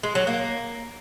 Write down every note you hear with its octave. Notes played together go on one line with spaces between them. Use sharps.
G#3
F#3
A#3